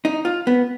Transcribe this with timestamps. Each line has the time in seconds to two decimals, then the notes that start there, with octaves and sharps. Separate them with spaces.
0.05 D#4
0.25 F4
0.47 B3